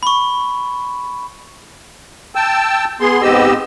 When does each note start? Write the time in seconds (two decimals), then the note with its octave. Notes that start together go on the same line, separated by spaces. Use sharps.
0.03 B5 C#6
2.35 G5 A5 E6
3.01 B3 G#4 C6
3.22 G#2 B3 C4 G4 D#5 E6